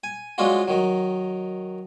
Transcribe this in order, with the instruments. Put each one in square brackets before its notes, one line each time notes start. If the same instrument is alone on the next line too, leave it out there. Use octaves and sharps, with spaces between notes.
[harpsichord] G#5
F3 G#3 C#4 D4 F4 F#4
D#3 F#3